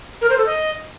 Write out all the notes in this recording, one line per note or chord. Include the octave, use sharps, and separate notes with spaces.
A#4
C5
A4
D#5